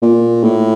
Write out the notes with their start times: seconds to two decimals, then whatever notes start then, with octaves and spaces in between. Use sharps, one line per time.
0.02 A#2
0.43 A2